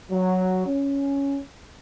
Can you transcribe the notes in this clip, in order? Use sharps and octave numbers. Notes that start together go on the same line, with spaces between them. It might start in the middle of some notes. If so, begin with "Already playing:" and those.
F#3
C#4